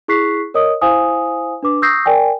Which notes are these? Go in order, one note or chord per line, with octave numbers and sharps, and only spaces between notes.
E4 G#4 C#6 F#6 B6 C7
A#4 C#5 D#5 D#6
E4 C5 F5 G#5 D#6
D4 B4 D6
C#6 D#6 E6 G6 A#6 C7
A#4 D5 G5 G#5